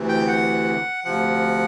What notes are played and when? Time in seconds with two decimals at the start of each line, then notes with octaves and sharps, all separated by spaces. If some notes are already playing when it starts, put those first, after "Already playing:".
Already playing: D2 C3 E3
0.09 G5
0.28 F#5
1.04 D2 C3 F3 F#5